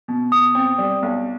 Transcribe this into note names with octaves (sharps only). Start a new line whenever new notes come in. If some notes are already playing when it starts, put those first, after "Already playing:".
B2
B2 D#6
C4
G3
B1